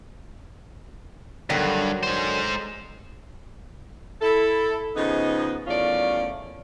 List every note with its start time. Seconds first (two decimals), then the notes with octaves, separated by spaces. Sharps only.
1.50 G2 D3 D#3 F#3
2.03 G#3 C5
4.21 E4 A4
4.96 C#3 F3 B3 D#4
5.67 E2 D#3 A3 C#4 F4 D5